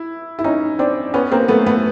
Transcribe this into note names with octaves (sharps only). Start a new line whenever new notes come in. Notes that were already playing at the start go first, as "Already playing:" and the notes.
Already playing: E4
E4
C#4 D#4
C4 D4
B3 C#4
A#3 C4
A3 B3
A3 B3